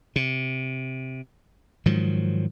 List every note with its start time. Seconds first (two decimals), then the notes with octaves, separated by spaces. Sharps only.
0.16 C3
1.86 G#2 D#3 F3 F#3